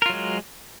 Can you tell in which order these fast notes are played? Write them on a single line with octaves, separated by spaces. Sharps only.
A#4 F4 F#3 G#3